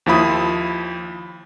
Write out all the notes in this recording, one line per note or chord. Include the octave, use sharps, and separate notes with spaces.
D#2 F3 E4 B5 D#6